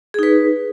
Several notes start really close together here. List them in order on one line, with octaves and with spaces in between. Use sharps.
G#4 D#4 B4